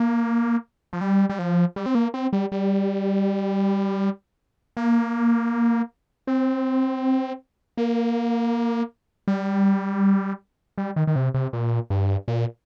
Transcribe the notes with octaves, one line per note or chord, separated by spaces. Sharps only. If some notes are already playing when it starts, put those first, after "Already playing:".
Already playing: A#3
F3
G3
G3
F3
G3
C4
A#3
C4
G3
G3
A#3
C4
A#3
G3
G3
D#3
D#3
C3
C3
A#2
G2
A#2